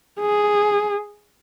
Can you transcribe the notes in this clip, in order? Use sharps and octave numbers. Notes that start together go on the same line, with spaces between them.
G#4